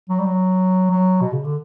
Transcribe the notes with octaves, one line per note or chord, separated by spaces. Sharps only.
F#3
G3
F#3
F#3
B2
C#3
D3